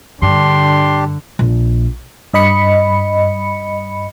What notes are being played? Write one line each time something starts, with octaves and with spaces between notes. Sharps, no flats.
G2 D3 D4 G4 C6
A#1
G2 D#5 B5 C#7